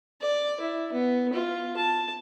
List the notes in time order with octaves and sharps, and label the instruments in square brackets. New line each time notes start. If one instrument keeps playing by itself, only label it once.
[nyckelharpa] D5
E4
B3
F4
A5